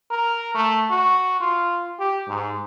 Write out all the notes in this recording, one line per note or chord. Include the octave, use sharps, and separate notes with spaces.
A#4
A3
F#4
F4
G4
G#2